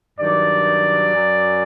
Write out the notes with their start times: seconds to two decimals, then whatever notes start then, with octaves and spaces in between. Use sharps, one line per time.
0.19 G2 D#3 F#3 D5
1.13 F#2 F#3